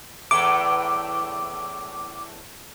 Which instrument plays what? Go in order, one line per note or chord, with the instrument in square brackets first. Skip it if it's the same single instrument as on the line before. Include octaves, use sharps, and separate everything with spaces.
[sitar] E2 A2 A3 [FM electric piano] D6